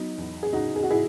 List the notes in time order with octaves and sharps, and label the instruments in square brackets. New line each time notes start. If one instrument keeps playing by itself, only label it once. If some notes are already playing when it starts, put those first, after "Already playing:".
Already playing: [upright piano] F#3 B3 D#4
E2
G#4
C#3 D#4 F#4
G#4
F#4
E4 G#4